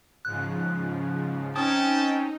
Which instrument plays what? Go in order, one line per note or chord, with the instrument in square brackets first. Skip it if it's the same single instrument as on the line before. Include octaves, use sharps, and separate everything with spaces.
[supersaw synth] G#2 C#3 F3 [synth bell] F#6
[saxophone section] C4 C#4 [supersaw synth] D#4 [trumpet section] G5 A5 [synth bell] D#6